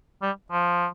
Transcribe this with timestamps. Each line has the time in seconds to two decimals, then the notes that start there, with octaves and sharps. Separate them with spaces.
0.22 G3
0.51 F3